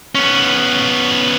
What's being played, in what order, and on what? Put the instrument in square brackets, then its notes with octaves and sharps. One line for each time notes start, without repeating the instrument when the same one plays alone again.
[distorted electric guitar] B3 C#4